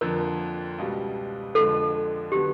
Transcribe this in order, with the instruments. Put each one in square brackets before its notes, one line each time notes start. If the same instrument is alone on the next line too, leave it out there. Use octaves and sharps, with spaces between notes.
[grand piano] F2 D3 F3 A#3 [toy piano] A#4
[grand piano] C#2 B2 G3
[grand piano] F2 D3 F3 G#3 [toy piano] A4
[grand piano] D3 F#3 B3 [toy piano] G4